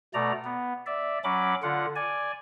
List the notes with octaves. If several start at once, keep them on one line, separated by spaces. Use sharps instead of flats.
B2 A3 D5 A#5
B3
D5 E5
F#3 C#4 B5 D6
D3 F4 F#5
D5 G#5